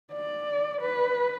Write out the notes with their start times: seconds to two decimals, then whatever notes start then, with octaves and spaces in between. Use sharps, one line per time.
0.13 D5
0.82 B4